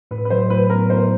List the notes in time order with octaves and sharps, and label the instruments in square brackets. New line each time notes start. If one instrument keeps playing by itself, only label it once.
[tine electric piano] A2 [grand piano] B4
[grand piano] B4
[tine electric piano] F#3 [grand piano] C5
[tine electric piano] A2 [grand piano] B4
[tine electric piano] B3 [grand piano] A#4
[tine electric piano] E4 [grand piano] C5